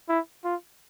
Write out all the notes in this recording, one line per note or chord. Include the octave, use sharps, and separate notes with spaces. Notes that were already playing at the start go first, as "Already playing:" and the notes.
E4
F4